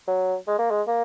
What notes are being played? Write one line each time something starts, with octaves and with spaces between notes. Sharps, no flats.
F#3
G#3
A#3
G#3
A#3